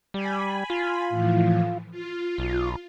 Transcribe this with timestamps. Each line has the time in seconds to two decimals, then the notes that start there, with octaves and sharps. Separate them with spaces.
0.14 G3 G#5 B5
0.70 F4
1.10 A2 E3 F3
1.91 F4
2.38 B1